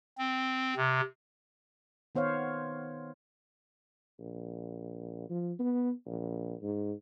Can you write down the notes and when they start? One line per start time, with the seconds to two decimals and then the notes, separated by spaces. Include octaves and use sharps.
0.18 C4
0.76 C3
2.15 D#3 B3 C5 C#5 F5
4.19 A#1
5.29 F3
5.59 B3
6.06 A#1
6.62 G#2